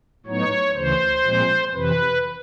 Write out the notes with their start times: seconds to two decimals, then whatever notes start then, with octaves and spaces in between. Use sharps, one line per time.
0.26 A2 F#3 B3 D#4 C#5
0.76 D2 C#3 E3 C5
1.24 A#2 F3 G#3 C4
1.73 F2 C3 E3 B4